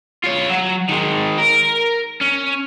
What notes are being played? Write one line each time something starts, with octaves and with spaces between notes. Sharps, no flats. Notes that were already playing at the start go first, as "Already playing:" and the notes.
F4 C#5
F#3
D#3 G#3
A#4
C#4